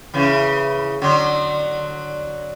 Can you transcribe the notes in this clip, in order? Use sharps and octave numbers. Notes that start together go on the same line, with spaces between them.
C#3 E3
D3 F#3